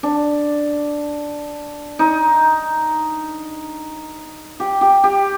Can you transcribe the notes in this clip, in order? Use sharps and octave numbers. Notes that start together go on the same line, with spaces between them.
D4
D#4
G4
G4
G4